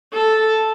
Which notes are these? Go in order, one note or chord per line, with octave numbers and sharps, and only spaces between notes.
A4